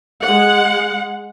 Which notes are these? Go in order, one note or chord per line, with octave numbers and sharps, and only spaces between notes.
G#3 F#5